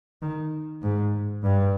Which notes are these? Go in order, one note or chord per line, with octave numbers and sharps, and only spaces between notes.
D#3
G#2
G2